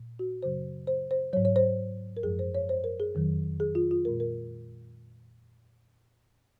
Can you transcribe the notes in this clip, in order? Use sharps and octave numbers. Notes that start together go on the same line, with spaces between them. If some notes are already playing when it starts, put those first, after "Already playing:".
Already playing: A#2
F#4
F#2 C#3 F#3 C5
C5
C5
G#2 F#3 C#5
C#5
C5
A#4
F#2 F3 G#3 G#4
C5
C#5
C5
A#4
G#4
F2 D#3 F#3
G#4
F4
F4
A#2 G#3 A#4
A#4